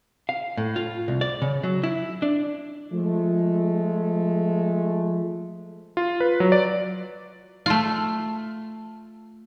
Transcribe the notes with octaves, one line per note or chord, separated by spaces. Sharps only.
F5
A2
F4
C2
D5
C#3
F#3
E4
D4
F3 G#3 A3
F4
B4
F#3
D5
A3 F4